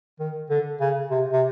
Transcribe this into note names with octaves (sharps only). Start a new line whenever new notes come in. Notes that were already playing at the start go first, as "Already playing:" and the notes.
D#3
D3
C#3
C3
C3